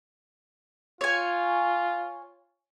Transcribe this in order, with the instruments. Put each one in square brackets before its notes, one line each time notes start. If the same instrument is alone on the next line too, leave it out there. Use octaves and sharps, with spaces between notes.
[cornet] F4 [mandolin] C#5 G#5